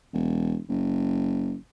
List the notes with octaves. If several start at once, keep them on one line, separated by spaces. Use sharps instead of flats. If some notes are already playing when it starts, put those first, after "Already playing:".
E1
F#1